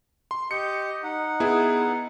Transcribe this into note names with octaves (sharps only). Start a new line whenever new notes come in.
C6
G4 D#5 G6 C#7
D#4 F#5
B3 E4 G#4